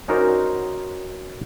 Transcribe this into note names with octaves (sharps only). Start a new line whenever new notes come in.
C#4 D#4 F#4 A#4 C5 D5